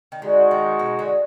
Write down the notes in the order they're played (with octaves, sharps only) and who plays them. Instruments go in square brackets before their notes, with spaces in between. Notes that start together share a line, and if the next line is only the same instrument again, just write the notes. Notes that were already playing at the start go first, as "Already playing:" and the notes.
[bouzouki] D#3
[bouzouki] D3 [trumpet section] G#3 D#4 F#4
[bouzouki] D#3
B2
D3